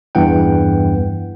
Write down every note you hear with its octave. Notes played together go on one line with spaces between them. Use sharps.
E2 G2 E3 F#5 G5